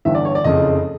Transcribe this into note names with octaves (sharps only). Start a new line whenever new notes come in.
G1 G2 E3 E5
D5
C#5
D5
F#1 F2 C#3 D#5